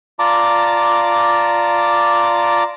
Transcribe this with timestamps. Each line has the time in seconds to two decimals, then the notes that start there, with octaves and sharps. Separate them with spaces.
0.19 F4 D5 A5 A#5 D6